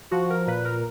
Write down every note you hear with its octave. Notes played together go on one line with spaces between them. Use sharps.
F3 F#4
A#4
A#2 B4
A#4